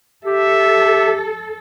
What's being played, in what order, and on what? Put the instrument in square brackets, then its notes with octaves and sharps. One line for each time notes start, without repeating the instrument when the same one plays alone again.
[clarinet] G4 [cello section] A4 [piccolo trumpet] E5